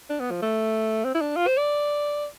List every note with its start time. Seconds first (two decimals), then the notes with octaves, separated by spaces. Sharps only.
0.10 D4
0.20 B3
0.31 F3
0.42 A3
1.05 C4
1.15 E4
1.21 D4
1.37 F4
1.47 C5
1.58 D5